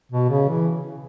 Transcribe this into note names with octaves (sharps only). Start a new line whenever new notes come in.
B2
C#3
E3